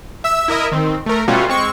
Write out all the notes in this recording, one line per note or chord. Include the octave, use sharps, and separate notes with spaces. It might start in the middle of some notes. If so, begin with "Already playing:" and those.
E5 E6
E4 A#4 D#5 E5
D#3 C4
A3 A#4
B2 G3 A3 C#4 F4 F#4
G#3 C4 C#6